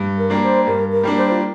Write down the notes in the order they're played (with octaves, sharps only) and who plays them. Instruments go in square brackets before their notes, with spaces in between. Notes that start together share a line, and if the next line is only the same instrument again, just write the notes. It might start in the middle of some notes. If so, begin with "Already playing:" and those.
Already playing: [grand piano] G2
[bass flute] A#4
[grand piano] G3 A#3 D4
[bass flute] C5
[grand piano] G2 [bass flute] A#4
[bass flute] A#4
[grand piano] G3 A#3 D4
[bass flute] C5
F4